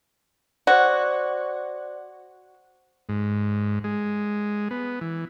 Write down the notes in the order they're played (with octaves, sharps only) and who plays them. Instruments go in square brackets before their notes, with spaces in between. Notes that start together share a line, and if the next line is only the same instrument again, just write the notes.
[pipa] F#4 [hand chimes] C5 D5
[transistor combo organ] G#2
G#3
B3
E3